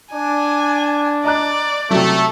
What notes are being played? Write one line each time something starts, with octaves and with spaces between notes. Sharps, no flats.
D4 G#5
D5 D#5 A#5 F#6
C3 F#3 A3